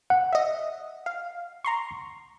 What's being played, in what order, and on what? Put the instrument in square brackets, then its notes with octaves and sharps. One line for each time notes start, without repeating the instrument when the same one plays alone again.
[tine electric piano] F#5
[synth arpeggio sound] D#5 E5
F5
A#5 C6 C#6